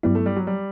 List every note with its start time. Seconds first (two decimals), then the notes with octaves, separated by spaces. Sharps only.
0.03 G2 F#3 G3 B3 E4
0.15 A3
0.26 G3
0.36 F#3
0.47 G3